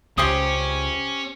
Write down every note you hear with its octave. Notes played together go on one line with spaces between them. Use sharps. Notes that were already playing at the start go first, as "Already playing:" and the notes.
C#2 C#4 G4 C5 D#6